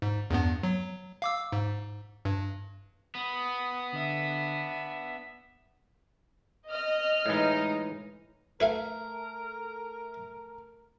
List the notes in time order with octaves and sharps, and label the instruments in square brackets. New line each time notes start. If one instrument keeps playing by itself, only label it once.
[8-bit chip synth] G#2
E2 G2 B3
F#3
F5 D6 E6
G#2
G2
[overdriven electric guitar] B3 [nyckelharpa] B5 D#6
[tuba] D3 [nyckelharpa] D4 E5
[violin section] D#5 F6
[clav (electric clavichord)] A2 E3 [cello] G#3 D#4
[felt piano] A3 [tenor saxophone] A#4 [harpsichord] B4 E5 F5